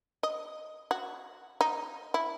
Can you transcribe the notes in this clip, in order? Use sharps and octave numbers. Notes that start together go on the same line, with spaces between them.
D#5
F#4
D#4
E4